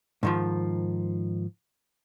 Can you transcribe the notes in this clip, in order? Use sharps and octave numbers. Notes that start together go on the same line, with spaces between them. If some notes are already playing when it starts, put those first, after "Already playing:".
G#2 D#3 F3